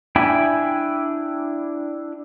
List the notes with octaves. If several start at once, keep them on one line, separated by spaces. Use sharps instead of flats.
D4 E4 G5 G#5 B5